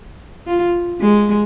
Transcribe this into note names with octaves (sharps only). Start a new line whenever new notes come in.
F4
G#3